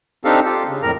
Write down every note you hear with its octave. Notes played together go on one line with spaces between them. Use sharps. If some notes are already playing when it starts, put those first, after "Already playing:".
C4 D4 D#4 G4 A4 F5
F4 G4 A4
C#3
F2 A2 A#4 A#5